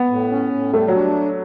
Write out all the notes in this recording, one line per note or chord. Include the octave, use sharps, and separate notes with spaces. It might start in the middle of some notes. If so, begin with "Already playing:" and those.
Already playing: B3
A2
C#4
A2
G3 A3
F#3
D4